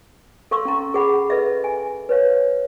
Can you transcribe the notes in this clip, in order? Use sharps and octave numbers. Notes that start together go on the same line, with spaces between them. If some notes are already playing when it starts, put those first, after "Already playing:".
A4 F5 C6 C#6 E6
C#4 A#5
G#4 F#5 B5
A4 B4 D#5 E5
G#5
B4 C#5 F5